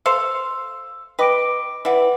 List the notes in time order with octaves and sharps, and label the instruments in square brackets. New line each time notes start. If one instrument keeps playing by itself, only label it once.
[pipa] A4 C5 F5 [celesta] E6
[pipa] B4 D#5 [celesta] G5 D6 D7
[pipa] E3 D5 [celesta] B4 F#5